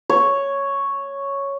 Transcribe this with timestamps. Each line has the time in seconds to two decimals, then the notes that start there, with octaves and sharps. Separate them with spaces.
0.10 C#5